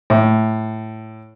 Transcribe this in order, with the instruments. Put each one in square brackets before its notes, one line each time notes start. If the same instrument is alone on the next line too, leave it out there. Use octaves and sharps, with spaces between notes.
[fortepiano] A2